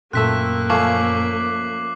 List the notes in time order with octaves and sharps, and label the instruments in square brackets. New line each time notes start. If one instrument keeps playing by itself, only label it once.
[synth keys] F#2 A#2 E6 [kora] A3 C4 [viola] A#3 [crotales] F#6 B6
[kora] F3 A3 C#4 [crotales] D6 C7 F#7